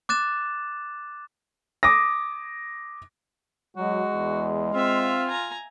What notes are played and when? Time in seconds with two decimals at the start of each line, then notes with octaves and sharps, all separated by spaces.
0.09 D6 F#6 A6 E7
1.83 D6 D#6 A#6
3.77 F#3 G#3 F#4
4.12 E2
4.74 C4 F4 E5 F5
5.28 G#5 A#5